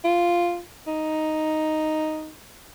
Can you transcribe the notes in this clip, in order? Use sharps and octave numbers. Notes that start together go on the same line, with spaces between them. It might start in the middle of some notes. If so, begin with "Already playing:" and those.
F4
D#4